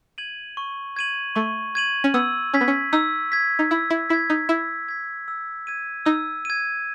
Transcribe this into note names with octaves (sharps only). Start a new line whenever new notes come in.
G#6 D#7 F#7
C#6
G#6 D#7 F#7
A3 C#6
G#6 D#7 F#7
C#4
B3 E6
C#4 G#6 B6
B3
C#4
D#4 E6
G#6 B6
D#4
E4 E6
E4
E4 G#6 B6
D#4
E4 E6
G#6 B6
E6
G#6 D#7
D#4 E6
G#6 D#7